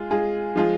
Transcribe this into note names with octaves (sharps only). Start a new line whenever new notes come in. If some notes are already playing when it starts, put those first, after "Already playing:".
Already playing: G#3 F4 G#4
G#3 F4 G#4
F3 G#3 F4 G#4